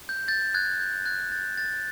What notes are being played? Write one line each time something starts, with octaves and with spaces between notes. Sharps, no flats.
G6
G6 A6
F#6 G#6
G6
A6
F#6 G#6
G6 A6
G6 A6